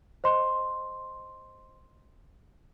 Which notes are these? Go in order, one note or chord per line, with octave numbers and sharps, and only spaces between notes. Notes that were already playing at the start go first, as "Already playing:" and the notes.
C5 D#5 C6